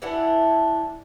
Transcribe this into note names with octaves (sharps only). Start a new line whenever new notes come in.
E3 D4 E4 F#5